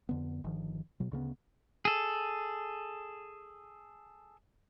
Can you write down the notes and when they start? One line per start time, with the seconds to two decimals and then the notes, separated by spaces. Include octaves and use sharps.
0.09 F2 D3 B3
0.44 G1 D#3 F3
1.00 B2 F#3
1.12 D2 C#3 A#3 B3
1.85 G#4 A4